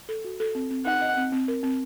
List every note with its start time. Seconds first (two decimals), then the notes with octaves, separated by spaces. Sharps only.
0.09 A4
0.24 F#4
0.40 A4
0.55 C4
0.70 C4
0.86 D#4 F#5
1.01 D#5
1.17 C4
1.32 C4
1.48 A#4
1.63 C4